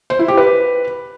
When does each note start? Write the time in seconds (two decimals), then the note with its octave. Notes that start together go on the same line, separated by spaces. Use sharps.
0.10 C5
0.19 E4
0.28 G4
0.37 B4